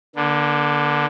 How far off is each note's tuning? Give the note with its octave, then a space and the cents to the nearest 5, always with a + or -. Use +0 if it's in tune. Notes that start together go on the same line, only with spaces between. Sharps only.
D3 +0 A#3 +40